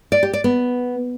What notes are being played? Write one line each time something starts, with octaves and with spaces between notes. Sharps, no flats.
D5
G4
D5
B3